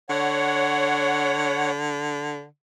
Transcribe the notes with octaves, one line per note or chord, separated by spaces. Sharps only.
D3 C#5 F#5